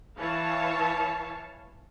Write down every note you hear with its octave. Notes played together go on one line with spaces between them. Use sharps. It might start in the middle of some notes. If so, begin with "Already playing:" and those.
E3 C#5 F5 A5